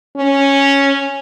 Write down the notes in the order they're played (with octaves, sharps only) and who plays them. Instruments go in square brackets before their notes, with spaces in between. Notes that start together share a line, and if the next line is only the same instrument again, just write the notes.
[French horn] C#4